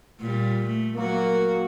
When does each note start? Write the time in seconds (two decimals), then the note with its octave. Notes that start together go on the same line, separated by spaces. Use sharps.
0.20 A#2 G3
0.67 A3
0.96 F#3 A#3 F#4